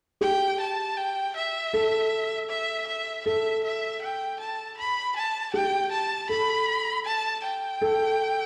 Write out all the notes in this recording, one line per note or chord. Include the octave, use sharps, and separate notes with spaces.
G4 G5
A5
G5
E5
A4
E5
E5
A4 E5
E5
G5
A5
B5
A5
G4 G5
A5
A4 B5
A5
G5
A4